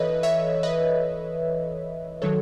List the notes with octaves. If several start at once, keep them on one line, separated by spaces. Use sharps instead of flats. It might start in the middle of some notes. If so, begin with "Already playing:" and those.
Already playing: E3 A4 B4 C#5 D#5 E5
C#5 E5
B4 D#5
D#3 F#3 A4 C#5